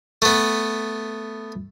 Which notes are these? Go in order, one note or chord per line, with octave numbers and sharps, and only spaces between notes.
A3 B3